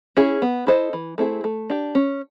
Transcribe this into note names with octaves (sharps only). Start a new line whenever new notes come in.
C#4 E4 G#4
B3
E4 A4 C5 D#5
E3
A3 C4 E4 G#4
A3
D4 G4
C#4